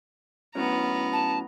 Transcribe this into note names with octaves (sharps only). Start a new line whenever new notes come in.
A2 F#3 B3 C#4 A#5
A5